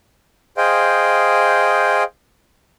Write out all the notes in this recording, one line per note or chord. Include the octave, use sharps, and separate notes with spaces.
G#4 C5 D#5 F5 G5